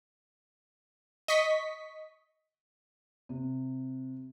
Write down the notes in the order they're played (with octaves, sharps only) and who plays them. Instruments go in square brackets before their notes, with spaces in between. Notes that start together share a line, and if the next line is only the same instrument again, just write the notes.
[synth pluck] D#5 C#6 B6
[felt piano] C3